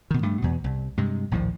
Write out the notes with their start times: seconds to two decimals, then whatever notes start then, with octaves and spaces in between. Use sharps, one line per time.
0.11 B2 D#3
0.23 G2 A3
0.42 E2 B2
0.64 C2
0.97 G2 C3 G#3
1.31 A#1 D#2 A2 F3